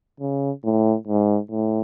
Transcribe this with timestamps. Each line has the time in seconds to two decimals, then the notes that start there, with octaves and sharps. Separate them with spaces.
0.20 C#3
0.64 A2
1.07 G#2
1.51 A2